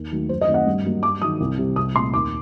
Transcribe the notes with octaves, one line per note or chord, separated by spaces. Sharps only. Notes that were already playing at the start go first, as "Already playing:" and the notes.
Already playing: D#2
D#3 F#3 A3
F#2 C5
D#5
D#3 A3 C4
F#5
G2
F#3 A#3
G2 D6
D#3 F#3 D#6
C2
C3 G3
C2 D#6
A#2 A3 C4 C6
D#2 D6